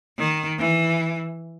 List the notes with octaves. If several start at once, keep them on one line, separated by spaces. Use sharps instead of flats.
D#3
E3